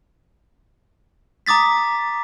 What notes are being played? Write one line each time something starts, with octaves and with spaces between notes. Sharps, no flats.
A#5 D6 D#6 A6 B6